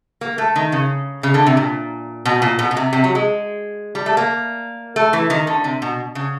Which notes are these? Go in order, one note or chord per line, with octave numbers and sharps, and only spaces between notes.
A#3
A3
D#3
C#3
C#3
D3
C3
A#2
B2
A#2
B2
B2
C3
C3
F#3
G#3
G3
A3
A#3
A3
E3
D#3
D3
C3
B2
C#3